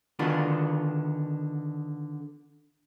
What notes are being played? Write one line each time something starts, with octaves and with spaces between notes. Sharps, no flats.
D3 D#3 B3 D4 F4 F#4